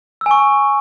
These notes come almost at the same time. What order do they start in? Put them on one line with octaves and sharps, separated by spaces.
E6 G#5 C#6